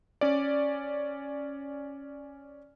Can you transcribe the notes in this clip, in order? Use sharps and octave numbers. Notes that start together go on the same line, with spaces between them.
C#4 D5